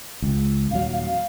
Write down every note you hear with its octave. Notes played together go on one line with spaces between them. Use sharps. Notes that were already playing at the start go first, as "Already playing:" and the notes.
C#2
D#1 F#3 F5
F5